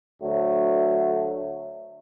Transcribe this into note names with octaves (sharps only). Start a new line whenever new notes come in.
D2 F#3 A3